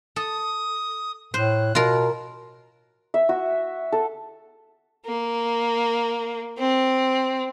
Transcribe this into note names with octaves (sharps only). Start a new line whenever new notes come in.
A4 D#6
A2 C5 F#6
B2 F4 A#4
E5
F#4
A4
A#3
C4